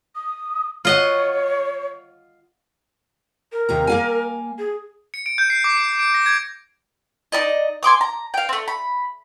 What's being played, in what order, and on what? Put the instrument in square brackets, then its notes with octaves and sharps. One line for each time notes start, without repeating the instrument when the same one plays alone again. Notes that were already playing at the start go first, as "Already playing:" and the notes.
[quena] D#6
[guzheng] F4 D#5 F#5 [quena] C#5
[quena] A#4
[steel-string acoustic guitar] D#2 C3 A#5
A#3 F5 G#5
[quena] G#4
[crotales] C#7
D7
G6
C7
D6
D7
D7
A#6
G#6
[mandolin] D#4 E4 D5 D#5
G#5 C6 D6 D#6
A#5
F5 G5
A3 C4
B5